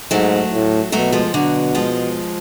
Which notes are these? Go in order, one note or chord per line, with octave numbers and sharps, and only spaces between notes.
G#2 F#3 A3
A2
B2 F#3 A3
F3 G#3
B2 D3 F#3
F3 G#3